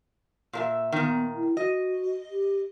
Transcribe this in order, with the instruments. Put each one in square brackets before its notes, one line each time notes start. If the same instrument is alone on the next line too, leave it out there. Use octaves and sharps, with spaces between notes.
[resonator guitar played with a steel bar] A#2 A4 E5
[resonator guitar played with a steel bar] A#2 D#3 [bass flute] B3
[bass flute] E4
[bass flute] F#4 [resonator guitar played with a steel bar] D#5
[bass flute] G4